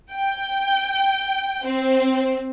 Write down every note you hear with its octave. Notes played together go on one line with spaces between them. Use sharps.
G5
C4